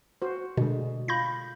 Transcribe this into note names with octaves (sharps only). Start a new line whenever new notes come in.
F#4 C5
B2 D3 G#3
F4 B5 G6 A#6